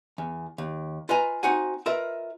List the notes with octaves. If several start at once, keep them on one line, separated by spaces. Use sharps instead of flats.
E2
D#2
F4 B4 D#5 G#5 A#5
C4 D#4 F#4 F#5 G#5
F4 A#4 B4 D#5 E5